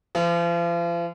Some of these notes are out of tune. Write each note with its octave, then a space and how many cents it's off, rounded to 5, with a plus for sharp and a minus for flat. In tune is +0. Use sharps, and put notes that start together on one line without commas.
F3 -40